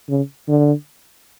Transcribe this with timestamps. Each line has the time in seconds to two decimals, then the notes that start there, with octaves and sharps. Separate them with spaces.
0.09 C#3
0.49 D3